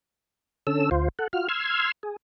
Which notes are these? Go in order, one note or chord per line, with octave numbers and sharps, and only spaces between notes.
D3 C#4 A4 E6
D2 F4 C5
A4 F#5
F4 F#4 F6
C6 E6 F6 G#6
G#4